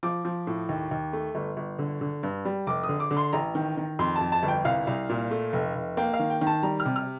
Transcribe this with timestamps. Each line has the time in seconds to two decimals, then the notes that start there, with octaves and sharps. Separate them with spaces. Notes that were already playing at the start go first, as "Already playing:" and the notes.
0.03 F3 D6
0.25 F3
0.47 A2
0.69 D#2
0.91 D#2
1.13 A3
1.35 G1
1.57 G1
1.79 D3
2.01 D3
2.23 G2
2.45 G3
2.67 F1 D6
2.84 D#6
2.89 D3
3.00 D6
3.11 D3
3.17 C6
3.33 A1 A#5
3.55 D#3
3.77 D#3
3.99 F2 C6
4.16 A5
4.21 F2
4.32 A5
4.43 G1
4.48 G5
4.65 C2 F5
4.87 C2
5.09 A#2
5.31 A3
5.53 F1
5.75 F1
5.97 A#3 G5
6.14 F5
6.19 D#3
6.30 G5
6.41 D#3
6.47 A5
6.63 G3 A#5
6.80 F6
6.85 C3
6.96 F6